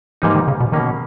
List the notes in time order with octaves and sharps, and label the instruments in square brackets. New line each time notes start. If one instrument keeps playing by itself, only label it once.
[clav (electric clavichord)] G#2 G3 A#3 D#4 [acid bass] E3
[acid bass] D#3
C#3
B2
[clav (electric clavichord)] B2 A#3 C#4 [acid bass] D#3